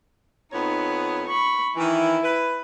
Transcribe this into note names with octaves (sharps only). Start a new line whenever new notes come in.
F2 B3 D#4 C#5
B5 C#6
D#3 E3 E4
B4